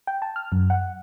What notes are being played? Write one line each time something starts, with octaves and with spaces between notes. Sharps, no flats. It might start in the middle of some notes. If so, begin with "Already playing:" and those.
G5
A5
F6
F#2
F#5